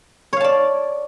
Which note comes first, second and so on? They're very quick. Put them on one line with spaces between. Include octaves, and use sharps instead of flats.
C#5 F5 A5 D5